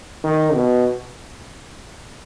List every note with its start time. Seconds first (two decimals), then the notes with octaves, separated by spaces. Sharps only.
0.24 D#3
0.54 B2